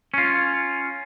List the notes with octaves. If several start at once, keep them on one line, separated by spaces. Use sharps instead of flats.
C#4 F4